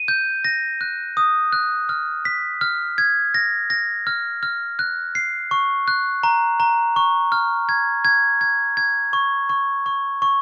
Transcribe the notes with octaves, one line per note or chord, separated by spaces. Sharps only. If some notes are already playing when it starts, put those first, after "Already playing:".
Already playing: D#7
G6
A#6
F#6
D#6
F#6
F6
B6
F6
G#6
A#6
A#6
F6
F6
F#6
C7
C#6
F#6
A#5
A#5
C#6
F6
G#6
G#6
G#6
G#6
C#6
C#6
C#6
C#6